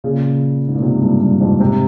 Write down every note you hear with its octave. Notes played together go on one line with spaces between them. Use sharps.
A#2 C#3
G#2
A#2
G#2 C3
G2 A#2
G2
F2 G#2
G#2 C3